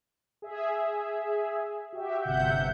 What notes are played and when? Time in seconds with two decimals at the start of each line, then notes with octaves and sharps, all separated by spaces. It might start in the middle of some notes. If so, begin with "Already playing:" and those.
0.42 G#4 E5
1.93 F#4 G4 E5
2.22 G1 C3 E5 F#5 G6